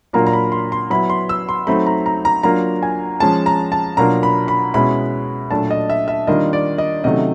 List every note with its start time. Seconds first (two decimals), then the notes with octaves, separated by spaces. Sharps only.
0.13 A#2 F#3 A#3 D4 F4 A#5
0.27 A#5
0.33 B5
0.52 C6
0.72 C6
0.90 F#3 B3 E4 B5
1.10 C6
1.29 E6
1.49 C6
1.67 F#3 A3 C4 D#4 B5
1.86 A#5
2.06 A#5
2.25 A#5
2.43 F#3 A#3 D4 F4 A#5
2.83 G#5
3.20 F3 G#3 C#4 A5
3.46 A#5
3.72 A5
3.97 B2 F#3 A#3 D4 F4 A#5
4.23 B5
4.48 B5
4.74 B2 G#3 C#4 E4 B5
5.51 A#2 F#3 A3 D4 A5
5.71 D#5
5.90 E5
6.08 E5
6.27 D#3 G3 A#3 D4 F4 D#5
6.53 D5
6.78 D#5
7.04 C3 D#3 F#3 A3 C#4 D#5